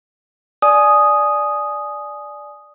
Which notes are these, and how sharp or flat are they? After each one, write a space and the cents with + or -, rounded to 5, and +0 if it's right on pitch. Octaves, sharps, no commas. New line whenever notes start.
D5 +0 G#5 +20 D#6 -5